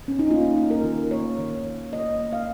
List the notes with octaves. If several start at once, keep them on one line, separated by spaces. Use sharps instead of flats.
C#4
D#4
A#3 F4
A#3
A#4
D#3
A#3 C#5
D#3
D#3
A#3 D#5
A#3
F5